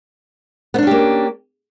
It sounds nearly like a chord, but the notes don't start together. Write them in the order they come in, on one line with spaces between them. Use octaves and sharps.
B3 D4 C#4 G4 A#3